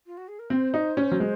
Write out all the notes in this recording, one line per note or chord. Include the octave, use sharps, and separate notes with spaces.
F4
F#4
G#4
A#4
C4 C5
D#4
C#4
F#3
G#3